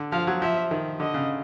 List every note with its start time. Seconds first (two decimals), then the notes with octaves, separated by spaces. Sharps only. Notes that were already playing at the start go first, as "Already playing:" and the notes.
Already playing: D3
0.12 F3 F5
0.27 F#3
0.41 F3 E5
0.71 D#3
0.99 D3 D#5
1.14 C#3